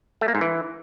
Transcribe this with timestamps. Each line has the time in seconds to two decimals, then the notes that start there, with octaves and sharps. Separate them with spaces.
0.21 A3
0.28 A#3
0.35 G#2
0.41 E3